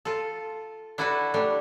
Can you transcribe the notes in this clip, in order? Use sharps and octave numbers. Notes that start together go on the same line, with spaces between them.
F4 A4
D4 E4 F#4 A4 B4 E5
G3 A3 D4